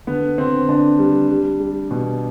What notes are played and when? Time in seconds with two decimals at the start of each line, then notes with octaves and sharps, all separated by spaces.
0.07 D3 B3
0.38 D3 C4
0.69 D3 D4
0.99 G3
1.30 G3
1.60 G3
1.91 B2